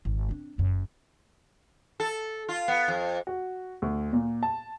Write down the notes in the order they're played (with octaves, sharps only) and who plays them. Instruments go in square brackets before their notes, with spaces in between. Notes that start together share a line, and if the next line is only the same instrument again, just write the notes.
[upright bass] G#1
C4 D4
F#1 F#2
[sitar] A4
F4
B3
F2
[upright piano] F#4
D2
A#2
A5